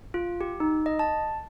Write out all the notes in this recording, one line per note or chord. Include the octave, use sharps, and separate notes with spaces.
F4
G4
D#4
D#5
A5